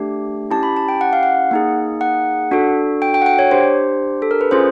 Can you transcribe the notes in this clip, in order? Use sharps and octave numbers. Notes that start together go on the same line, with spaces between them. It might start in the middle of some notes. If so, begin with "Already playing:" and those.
Already playing: A3 D4 G4
C#4 E4 G4 A5
B5
A5
G5
F#5
F5
F#5
A#3 D#4 G#4
F#5
D4 F#4 A4
G5
G5
F#5
G5
C#5
D4 G4 C5
A4
A#4
B4
C#4 F4 G#4 C5